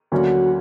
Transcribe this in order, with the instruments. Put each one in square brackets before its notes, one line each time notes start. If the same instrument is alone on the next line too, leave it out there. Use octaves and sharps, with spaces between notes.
[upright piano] D2 D3 F#3 A#3 C#4 [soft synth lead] F#4